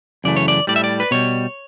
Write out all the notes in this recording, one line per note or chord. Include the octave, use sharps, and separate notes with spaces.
F#2 C#3 E3 A3 D5
C#5
D5
A2 G3 D5
E5
D5
B4
B2 G3 C#5